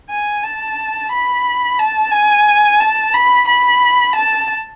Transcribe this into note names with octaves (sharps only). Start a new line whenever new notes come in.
G#5
A5
B5
A5
G#5
A5
B5
B5
A5